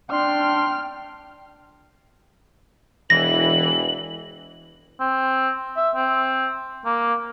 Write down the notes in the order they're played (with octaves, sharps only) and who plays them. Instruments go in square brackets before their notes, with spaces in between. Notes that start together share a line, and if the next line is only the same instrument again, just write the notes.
[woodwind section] D4 C6 [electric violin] G5 F6
[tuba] E1 [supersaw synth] E3 [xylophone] A#6 [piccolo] F#7
[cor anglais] C4
E5
C4
A#3